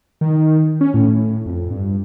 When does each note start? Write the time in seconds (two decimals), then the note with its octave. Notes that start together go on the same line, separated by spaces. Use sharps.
0.21 D#3
0.81 C#4
0.94 A2
1.46 F2
1.71 G2